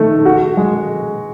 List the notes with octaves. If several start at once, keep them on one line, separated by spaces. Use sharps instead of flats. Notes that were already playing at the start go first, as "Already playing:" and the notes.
Already playing: D#3 A3
F#4
G#3